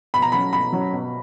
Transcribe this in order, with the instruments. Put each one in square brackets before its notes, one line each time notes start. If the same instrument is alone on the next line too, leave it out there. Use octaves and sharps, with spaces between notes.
[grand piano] B2 [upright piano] B5
[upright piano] A#5
[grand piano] F#3 C#4 [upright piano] B5
[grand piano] B2 [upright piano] B5
[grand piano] F#3 C#4
B2